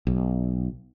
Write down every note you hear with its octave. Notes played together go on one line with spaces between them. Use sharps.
B1